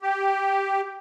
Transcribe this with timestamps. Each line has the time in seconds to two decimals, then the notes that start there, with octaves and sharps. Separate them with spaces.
0.02 G4